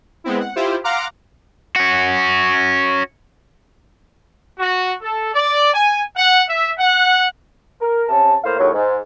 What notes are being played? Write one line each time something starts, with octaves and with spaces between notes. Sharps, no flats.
G#3 B3 C4 E4
F#5
E4 F4 G4 C5
F5 F#5 A#5 C6 D6 F6
C#4 F#4
F#4
A4
D5
G#5
F#5
E5
F#5
A#4
C3 C#4 A5
A2 A#3 C5 F5
D#2 A2 F#3 C#5
G#2